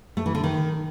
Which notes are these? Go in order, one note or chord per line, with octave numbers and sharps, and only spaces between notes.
A3
E3
D3
D#3